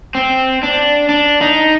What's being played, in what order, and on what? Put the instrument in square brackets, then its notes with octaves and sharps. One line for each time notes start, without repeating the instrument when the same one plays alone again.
[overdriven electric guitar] C4
D4
D4
D#4